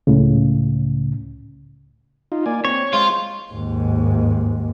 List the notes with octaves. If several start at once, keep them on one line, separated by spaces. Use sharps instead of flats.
C#2 A2 C#3
D#4 F4
A#3 D5 G#5
C4 C#5
G#3 F4 C5
D#2 G#2